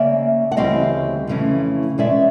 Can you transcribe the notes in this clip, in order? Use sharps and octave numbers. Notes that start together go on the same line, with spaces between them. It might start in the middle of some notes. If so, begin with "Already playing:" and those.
Already playing: C#3 A#3 D5 E5
F#5
D2 C#3 E3 G3 C4 D#5 F5
F2 C#3 E3 A3 C#4
B2 G#3 C#4 D5 E5